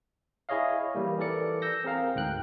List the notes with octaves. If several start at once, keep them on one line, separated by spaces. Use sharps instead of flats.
E4 G#4 C#5 D#5 F5
E3 G3 A#3
E3 A4 A#4 D5 C#7
E6 G6 A#6
C4 G#4 A#4 F5 A#5
D2 G#2 G5 F#6